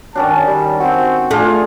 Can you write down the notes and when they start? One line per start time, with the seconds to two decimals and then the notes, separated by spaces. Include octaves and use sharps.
0.15 D#3 F#3 C#4 D4 A5
0.47 G3
0.80 C4 F#4
1.31 A3 D4 F4 G#4 G#5